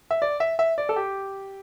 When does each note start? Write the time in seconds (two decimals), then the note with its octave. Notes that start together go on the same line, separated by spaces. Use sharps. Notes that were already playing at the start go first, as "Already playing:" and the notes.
0.11 E5
0.22 D5
0.40 E5
0.59 E5
0.78 D5
0.89 A4
0.96 G4